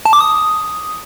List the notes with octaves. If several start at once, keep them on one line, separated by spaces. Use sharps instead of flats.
A5
D6
D#6